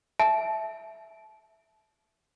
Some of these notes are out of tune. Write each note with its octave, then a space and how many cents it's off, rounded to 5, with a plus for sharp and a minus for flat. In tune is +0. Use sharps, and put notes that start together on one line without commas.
E5 +0 A5 -30